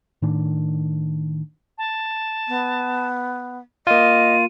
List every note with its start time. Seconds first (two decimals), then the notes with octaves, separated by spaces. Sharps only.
0.22 A2 D#3 D4
1.78 A5
2.48 B3
3.87 A#3 F4 D#5 D#7